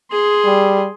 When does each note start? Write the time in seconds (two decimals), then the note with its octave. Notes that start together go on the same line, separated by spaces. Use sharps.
0.11 G#4 C6
0.45 G3